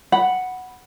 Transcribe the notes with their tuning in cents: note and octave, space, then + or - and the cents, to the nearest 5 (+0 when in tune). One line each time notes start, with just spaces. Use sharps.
F#5 +0 B5 +0